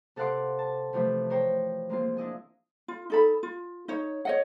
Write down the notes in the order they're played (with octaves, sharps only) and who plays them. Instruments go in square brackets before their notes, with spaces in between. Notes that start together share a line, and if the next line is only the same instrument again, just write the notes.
[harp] C3 A4 F5 F#5 C6 D6
A5
C3 E3 F3 A3
A#4 C5 C#5 G5
G#3 A#3 C4 F4
D4 E4 D#5 G#5
[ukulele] F4
D#4 A4 B5
F4
D#4 C#5
C#5 D#5 F#5